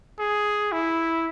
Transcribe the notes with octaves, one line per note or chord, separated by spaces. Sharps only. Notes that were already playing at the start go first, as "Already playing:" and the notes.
G#4
E4